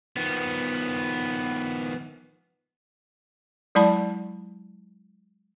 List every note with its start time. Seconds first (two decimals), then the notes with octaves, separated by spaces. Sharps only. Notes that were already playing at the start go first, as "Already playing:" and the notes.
0.17 D#3 F3 B3
3.75 F#3 G#3 E4 D5 A5 B5